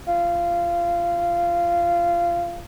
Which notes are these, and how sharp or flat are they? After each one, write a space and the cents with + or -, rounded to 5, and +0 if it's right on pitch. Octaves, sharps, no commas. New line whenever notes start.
F4 -20